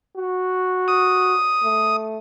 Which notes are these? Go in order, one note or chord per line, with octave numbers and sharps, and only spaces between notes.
F#4
D#6
A3